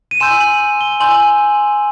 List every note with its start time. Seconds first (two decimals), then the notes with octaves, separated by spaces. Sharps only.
0.11 D#7
0.20 G#5 C6 E6 G6 E7
0.40 F#7
0.81 G7
1.00 G#5 C6 E6 G6 F#7